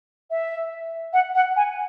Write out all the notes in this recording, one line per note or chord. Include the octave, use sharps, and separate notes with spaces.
E5
F#5
F#5
G#5